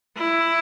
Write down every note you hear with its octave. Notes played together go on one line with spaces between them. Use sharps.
E4